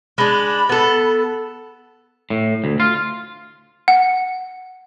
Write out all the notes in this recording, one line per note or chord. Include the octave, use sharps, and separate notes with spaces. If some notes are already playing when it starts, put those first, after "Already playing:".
G#3 D4 B5
B3 A4
A2
D2
F4
F#5